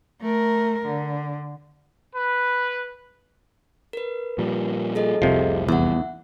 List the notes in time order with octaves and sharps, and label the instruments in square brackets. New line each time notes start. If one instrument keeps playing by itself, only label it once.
[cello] A3 A#4
D3
[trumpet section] B4
[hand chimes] A#4 B4
[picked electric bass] A#2 F3 G3
[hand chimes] G#4 A4 D#5
[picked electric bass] F1 C2 [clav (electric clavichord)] C3 F3
[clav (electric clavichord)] E2 [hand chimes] E5 F#5